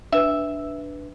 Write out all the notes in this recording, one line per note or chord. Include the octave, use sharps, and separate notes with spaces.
D4 B4 E5